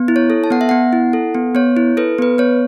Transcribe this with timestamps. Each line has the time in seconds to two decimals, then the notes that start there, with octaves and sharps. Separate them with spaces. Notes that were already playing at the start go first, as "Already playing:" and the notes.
Already playing: B3
0.08 E4
0.16 C#5
0.30 A4
0.44 A5
0.51 B3 F#5
0.61 E5
0.69 B3 F#5
0.93 E4
1.13 A4
1.35 B3
1.55 B3 C#5
1.77 E4
1.97 A4 B4
2.18 B3 B4
2.38 B3 C#5